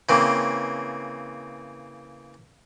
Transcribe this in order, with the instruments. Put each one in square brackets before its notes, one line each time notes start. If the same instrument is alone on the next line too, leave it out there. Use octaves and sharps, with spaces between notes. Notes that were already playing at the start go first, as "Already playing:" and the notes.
[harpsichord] C#3 E3 A#3 C4